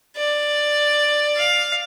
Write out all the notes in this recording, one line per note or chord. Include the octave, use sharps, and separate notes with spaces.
D5
F5